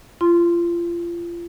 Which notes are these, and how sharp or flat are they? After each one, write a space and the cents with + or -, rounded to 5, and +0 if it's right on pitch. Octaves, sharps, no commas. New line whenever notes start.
F4 -30 C6 +0